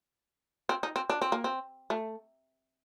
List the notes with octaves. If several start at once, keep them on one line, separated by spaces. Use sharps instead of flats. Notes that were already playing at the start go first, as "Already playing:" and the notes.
C4
D#4
C4
D4
C4
A#3
C4
A3